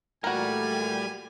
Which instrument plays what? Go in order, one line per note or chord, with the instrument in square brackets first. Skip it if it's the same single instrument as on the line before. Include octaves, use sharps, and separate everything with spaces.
[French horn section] A#2 E3 A3 [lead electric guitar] G3 [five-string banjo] F#4 A#4 [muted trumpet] G#5